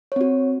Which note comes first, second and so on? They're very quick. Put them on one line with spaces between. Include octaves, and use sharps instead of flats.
C#5 C4 F#4